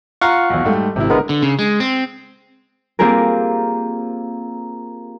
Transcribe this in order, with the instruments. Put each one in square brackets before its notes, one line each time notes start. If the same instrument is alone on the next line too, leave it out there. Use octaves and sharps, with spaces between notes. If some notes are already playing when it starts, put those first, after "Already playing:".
[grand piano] F4 A#5 [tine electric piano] F5 F#5 C#6
[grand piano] B1 E2
G#2 G3 A3
[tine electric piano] G#1 [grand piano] C3 E4
[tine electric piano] D3 G#3 B3 [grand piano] A#4
[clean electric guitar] D3
C#3
G#3
C4
[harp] A#3 C4 F4 G4 G#4 A#4